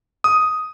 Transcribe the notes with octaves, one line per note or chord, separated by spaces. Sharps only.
D#6